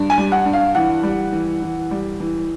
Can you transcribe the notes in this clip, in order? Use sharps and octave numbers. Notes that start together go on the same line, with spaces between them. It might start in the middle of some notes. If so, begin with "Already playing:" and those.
Already playing: G2
G#5
G3
F#5
G2
F5
E3 F#5
G3
E3
E3
G3
E3